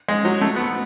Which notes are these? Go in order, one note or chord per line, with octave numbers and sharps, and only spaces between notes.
G#3
F#3
A3
B3